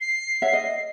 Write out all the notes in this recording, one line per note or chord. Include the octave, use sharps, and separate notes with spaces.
C7
C#5 E5 F#5
D#5